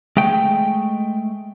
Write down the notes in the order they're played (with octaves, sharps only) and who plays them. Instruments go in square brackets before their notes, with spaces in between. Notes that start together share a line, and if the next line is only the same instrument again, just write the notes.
[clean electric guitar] G#3 A3 G5